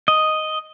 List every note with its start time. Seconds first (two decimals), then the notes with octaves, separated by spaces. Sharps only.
0.08 D#5